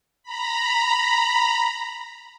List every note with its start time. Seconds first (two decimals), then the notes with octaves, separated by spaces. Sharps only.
0.23 A#5 B5